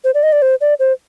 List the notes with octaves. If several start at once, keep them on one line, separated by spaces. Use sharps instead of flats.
C5
D5
D#5
D5
C5
D5
C5